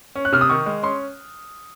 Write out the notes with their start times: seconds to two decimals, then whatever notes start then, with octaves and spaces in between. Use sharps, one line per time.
0.15 C#4
0.25 F#6
0.32 C3 F6
0.41 D#6
0.49 D#3 C#6
0.66 G#3
0.83 C#4 C6